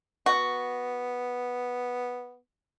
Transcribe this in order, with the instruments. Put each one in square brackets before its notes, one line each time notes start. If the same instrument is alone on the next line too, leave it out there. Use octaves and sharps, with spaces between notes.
[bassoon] B3 [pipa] F#4